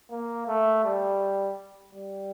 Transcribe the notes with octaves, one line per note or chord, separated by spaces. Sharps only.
A#3
A3
G3
G3